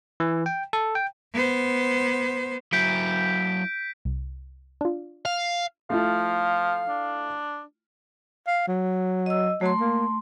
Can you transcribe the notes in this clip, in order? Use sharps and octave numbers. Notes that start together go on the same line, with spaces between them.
E3
G5
A4
G5
B3 C5
F#3 E4 G6 B6 D7
C2
D4 F4
F5
F3 A3 E4 F4 F5
D4
F5
F#3
D#5 E6
F#3 A3 C6
A#3